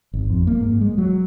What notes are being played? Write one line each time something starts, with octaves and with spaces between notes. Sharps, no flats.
G#1
F2
A#3
G#2
G#3
F#3